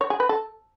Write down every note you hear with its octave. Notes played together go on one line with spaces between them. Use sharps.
C#5
G#4
B4
A4